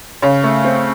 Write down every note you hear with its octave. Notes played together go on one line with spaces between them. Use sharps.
C#3 C#5
A3
C4